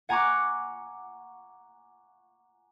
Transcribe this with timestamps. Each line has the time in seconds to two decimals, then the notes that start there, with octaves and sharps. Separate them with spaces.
0.09 F#5 G#5 A#5 C#6 D6 F#6